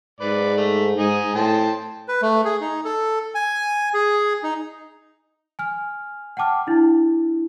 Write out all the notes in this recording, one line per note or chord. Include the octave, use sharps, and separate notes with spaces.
G#2 B4 D5
A3
G#2 D#4 G#4
A2 C5 G5 A5
B4
A3
G#4
D#4
A4
G#5
G#4
D#4
G#5 F6
F#5 G5 A5 D6 F6
D4 E4